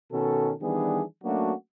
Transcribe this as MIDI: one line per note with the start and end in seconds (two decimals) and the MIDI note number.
0.12 0.52 47
0.12 0.52 51
0.12 0.52 61
0.12 0.52 69
0.61 1.02 51
0.61 1.02 52
0.61 1.02 55
0.61 1.02 59
0.61 1.02 62
0.61 1.02 68
1.24 1.52 54
1.24 1.52 57
1.24 1.52 58
1.24 1.52 61
1.24 1.52 62
1.24 1.52 66